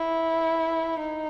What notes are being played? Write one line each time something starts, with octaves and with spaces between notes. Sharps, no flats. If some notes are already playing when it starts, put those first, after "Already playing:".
Already playing: E4
D#4